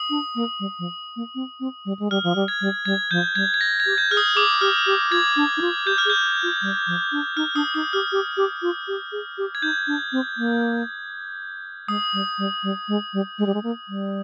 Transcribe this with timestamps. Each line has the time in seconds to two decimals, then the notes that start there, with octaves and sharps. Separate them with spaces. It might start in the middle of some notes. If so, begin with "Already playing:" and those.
Already playing: D#6
0.10 D4
0.35 A#3
0.60 G3
0.79 F3
1.16 A#3
1.35 C4
1.60 C4
1.85 G3
1.99 G#3
2.11 G3 F6
2.24 F3
2.36 G3
2.48 G#6
2.61 G3
2.86 G3 G#6
3.11 F3 G6
3.35 G3 G#6
3.54 G#6
3.61 A#6
3.80 G#6
3.86 G4
3.98 G6
4.11 G#4 F6
4.17 D#6
4.36 G#4 D6
4.61 G4 F6
4.87 G4
5.11 F4 G#6
5.36 D4
5.57 D#4
5.61 F4
5.86 G4 G6
5.98 F6
6.05 G#4
6.10 G6
6.43 F4
6.62 G3
6.87 F3
7.12 D4
7.37 D#4 F6
7.55 D4 D#6
7.74 D#4 D#6
7.93 G4 F6
8.12 G4
8.37 G4
8.62 F4
8.88 G4
9.12 G#4
9.38 G4
9.55 G#6
9.62 D#4 G6
9.87 D4
10.12 C4
10.37 A#3
11.88 G#3 D#6
12.13 G3
12.38 G3
12.63 G3
12.88 G#3
13.13 G3
13.39 G#3
13.46 G3
13.54 G#3
13.63 A#3
13.88 G3